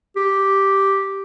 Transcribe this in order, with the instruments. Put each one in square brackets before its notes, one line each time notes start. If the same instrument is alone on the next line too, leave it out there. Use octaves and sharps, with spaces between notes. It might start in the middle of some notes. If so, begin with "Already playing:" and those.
[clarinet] G4